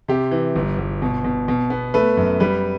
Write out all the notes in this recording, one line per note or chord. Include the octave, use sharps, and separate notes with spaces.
C3 G4
E3
G1
G1
B2
B2
B2
B3
A3 B4
F#2
G3 B4